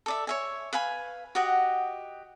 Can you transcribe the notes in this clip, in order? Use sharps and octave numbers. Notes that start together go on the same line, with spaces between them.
A4 D5 E5
C#5 E5 G#5
B4 F5 G#5 B5
F#4 G4 D#5 F#5